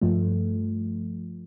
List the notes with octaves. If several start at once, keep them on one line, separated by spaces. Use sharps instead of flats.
G2 F3 A3